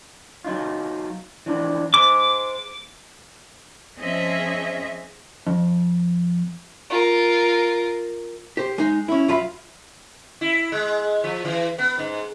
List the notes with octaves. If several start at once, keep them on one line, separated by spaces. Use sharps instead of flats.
F#3 D#4 F4
E3 F3 D4
G#4 C5 D6
F3 C4 C#4 G#4 D#5 E5
F2
F4 A#4
G4 C5
G#3 D#4
C#4 E4
F#2 F4 E5 B5
E4
G#3
F3
E3
B3
G#2